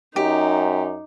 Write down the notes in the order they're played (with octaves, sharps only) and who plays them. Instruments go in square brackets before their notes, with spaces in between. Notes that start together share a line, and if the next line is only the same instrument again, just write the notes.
[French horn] F#2 [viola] D#4 [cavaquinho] G4